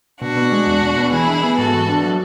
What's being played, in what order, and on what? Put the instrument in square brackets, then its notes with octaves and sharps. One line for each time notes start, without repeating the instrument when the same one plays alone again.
[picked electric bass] B2 [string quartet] D4 F#4
[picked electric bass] B3
G#3
E2
B2
B3
[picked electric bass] E3 [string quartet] E4 G#4
[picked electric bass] D4
B3
[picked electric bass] G#2 [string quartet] F#4 A4
[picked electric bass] E3
D4
F#3